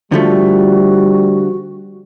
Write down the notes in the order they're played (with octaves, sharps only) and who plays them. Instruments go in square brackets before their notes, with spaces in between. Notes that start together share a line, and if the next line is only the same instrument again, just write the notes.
[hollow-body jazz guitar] D3 F3 A3 [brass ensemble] G3 [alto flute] F#4